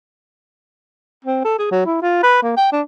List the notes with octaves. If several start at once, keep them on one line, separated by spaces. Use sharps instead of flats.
C4
A4
G#4
F#3
E4
F4
B4
A#3
G5
D4